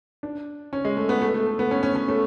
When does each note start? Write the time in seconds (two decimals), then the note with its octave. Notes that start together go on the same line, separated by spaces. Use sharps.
0.23 D4
0.73 C#4
0.85 G#3
0.97 A3
1.09 B3
1.21 A3
1.34 A3
1.47 A3
1.59 B3
1.71 C#4
1.83 C#4
1.96 C#4
2.08 A3